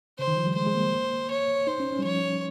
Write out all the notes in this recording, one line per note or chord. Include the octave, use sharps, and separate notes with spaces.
C#3 C5
D#3
F3
G3
G#3 C5
G#3
A#3
C#5
D#4 C5
C#4
C#4
G3
F3 C#5